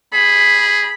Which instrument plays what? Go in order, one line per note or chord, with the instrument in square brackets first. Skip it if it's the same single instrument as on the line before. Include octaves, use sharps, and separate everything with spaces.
[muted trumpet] G#4 [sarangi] B5